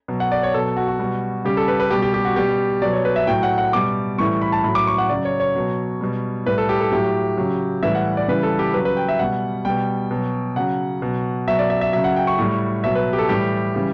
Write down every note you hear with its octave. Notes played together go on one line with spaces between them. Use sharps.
B2 F#3
F#5
D5
C#5
B2 F#3 A4
F#4
F#4
B2 G3
C#3 G3 G4
A4
B4
B4
B2 G3 G4
G4
G4
F#4
B2 G3 G4
B2 F#3 D5
C#5
B4
E5
A2 F#3 G5
F#5
F#5
B2 G3 D6
A2 E3 G3 C#6
B5
A5
A2 F#3 B5
D6
C#6
F#5
C#3 F#3 D5
C#5
C#5
B2 F#3
B2 G3
A2 G3 B4
A4
G4
A4
A2 F#3 G4
C#3 F#3
A2 E3 G3 E5
F#5
D5
C#3 E3 G3 B4
A4
G4
C#3 F#3 B4
B4
G5
E5
B2 G3 F#5
B2 G3 G5
B2 F#3
C#3 F#3 F#5
B2 F#3
B2 F#3 E5
D5
E5
E5
C#3 F#3 E5
F#5
G5
C#6
A2 G3
B2 F#3 E5
B4
G4
A4
A2 E3 G3 G4
C#3 E3 G3